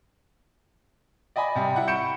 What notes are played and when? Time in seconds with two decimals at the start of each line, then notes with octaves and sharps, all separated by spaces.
1.36 D5 D#5 G#5 B5
1.55 C3 G3
1.76 E4 F#5
1.87 B5 C#6 G6 C#7 D7 E7